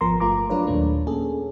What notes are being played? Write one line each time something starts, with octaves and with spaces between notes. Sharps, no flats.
G#1 F3 B3 A#4 A#5 C6
G1 A3 F4 A#5 D6
F#3 D4 F4 A#4 B4 C#5
D#2 A#2 A3 D4
A#3 C#4 G#4 A4